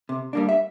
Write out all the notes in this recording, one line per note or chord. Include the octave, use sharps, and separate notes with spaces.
C3
G3 A#3 D4
E5